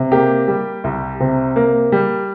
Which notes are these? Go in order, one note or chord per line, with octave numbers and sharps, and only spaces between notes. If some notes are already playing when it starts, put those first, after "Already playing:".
Already playing: C3
A#3 G4
G3
C2
C3
A#3
G3